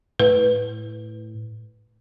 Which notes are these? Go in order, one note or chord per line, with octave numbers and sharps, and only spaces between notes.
A2 B4